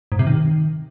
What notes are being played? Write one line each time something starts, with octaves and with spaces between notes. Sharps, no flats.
G#2
C3
D#3